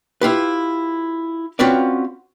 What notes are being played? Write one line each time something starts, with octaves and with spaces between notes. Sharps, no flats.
E4 F4 G4 B4
C4 C#4 F4 F#4 B4 D5